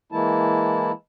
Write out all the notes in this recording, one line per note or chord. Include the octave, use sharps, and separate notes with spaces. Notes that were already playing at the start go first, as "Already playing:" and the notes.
E3 G#3 A#3 E4 A5